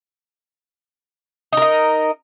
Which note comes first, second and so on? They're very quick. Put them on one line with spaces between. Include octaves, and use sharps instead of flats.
D#4 A#4 D#5